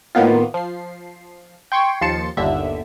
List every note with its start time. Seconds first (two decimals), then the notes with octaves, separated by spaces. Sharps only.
0.15 A2 D#3 A#3 B3 F4
0.54 F3 C7
1.72 G5 C6 C#6 G#6
2.01 D#2 F3 C6 A6 C#7 E7
2.37 G1 D#2 D3 E5